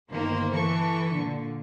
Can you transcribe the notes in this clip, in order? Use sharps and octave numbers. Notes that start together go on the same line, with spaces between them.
G1 D#3 A#3 C5
E3 A4 C#6
A#2 D3